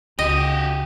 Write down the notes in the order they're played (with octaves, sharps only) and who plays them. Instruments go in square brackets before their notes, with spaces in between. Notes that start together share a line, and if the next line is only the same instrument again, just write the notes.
[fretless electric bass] C#2 [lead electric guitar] F#4 G4 [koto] D#5